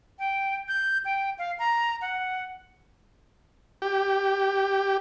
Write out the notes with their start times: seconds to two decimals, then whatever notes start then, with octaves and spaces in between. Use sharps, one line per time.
0.19 G5
0.68 G6
1.05 G5
1.38 F5
1.59 A#5
2.01 F#5
3.82 G4